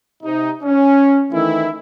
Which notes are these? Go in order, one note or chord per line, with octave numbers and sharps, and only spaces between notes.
C3 D#4
C#4
D#3 E3 A3 E4